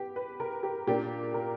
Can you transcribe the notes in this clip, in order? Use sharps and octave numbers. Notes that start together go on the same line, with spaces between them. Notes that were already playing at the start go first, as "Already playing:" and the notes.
Already playing: B3 G4
B4
A#4
G4
A#2 A#3 D4 G4
A#4